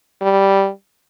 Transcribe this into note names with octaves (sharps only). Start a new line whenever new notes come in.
G3